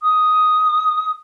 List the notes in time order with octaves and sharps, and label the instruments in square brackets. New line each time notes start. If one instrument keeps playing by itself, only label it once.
[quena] D#6